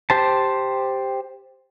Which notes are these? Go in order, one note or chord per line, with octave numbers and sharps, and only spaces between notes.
G4 C5 A5